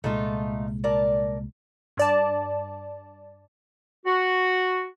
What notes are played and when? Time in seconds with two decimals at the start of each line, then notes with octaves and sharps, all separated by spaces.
0.04 C2 A#2 G#3 A3 D#4 F4
0.84 A#4 D5 A5
1.97 G2 D5 A5
4.05 F#4